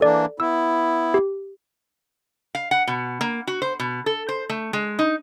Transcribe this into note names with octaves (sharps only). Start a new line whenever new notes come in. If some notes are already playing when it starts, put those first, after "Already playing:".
E3 A#3 D4 A4 D5
B3 E4 E6
G4
F5
F#5
B2
A#3
F#4
C5
B2
A4
C5
A3
G#3
D#4